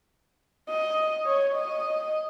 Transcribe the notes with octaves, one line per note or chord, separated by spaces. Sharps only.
D#5
C#5
D#5